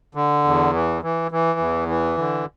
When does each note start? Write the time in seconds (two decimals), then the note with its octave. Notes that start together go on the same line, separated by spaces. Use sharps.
0.15 D3
0.44 E2
0.73 E3
1.03 E3
1.31 E3
1.59 E2
1.88 E3
2.18 D3